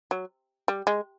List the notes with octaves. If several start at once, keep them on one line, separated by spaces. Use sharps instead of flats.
F#3
G3
G#3